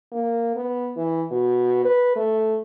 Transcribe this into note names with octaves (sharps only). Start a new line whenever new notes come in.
A#3
B3
E3
B2
B4
A3